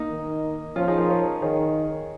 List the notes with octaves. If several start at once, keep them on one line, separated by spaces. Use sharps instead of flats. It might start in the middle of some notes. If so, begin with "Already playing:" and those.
Already playing: A#3 D#4
D#3
F3 C#4 F4
D#4 G#4
F4 A#4
G#4 C#5
D#3 G#4 C#5